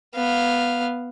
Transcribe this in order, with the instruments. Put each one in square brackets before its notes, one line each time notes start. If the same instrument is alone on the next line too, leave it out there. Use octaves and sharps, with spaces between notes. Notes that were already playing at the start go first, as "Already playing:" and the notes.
[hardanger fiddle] B3 F5